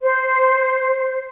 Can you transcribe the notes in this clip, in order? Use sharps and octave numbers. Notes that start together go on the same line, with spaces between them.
C5